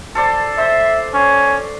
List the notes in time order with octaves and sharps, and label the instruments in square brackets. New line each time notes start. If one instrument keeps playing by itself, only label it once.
[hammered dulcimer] A4 C5 D5
[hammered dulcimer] C5 [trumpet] E5
[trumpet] C#4